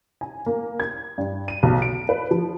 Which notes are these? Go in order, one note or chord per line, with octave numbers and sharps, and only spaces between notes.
G#5
A#3
G#6
G2
D#7
B1
D7
B4
F3